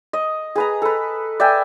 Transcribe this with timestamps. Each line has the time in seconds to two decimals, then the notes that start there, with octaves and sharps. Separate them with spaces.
0.13 D#5
0.56 G#4 B4 A#5
0.82 A4 B4
1.40 D5 E5 G5 G#5